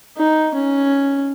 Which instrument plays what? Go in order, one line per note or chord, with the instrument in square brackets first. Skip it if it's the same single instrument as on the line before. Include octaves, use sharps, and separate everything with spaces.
[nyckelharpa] D#4
C#4